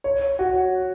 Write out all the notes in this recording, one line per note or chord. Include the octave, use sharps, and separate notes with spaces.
C#5
F#4